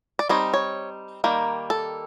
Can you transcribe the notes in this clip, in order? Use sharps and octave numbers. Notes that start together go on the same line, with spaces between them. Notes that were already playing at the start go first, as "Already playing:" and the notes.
D5
G3 C4 D#4 C#5
C#5
D#3 G3 A#3
A4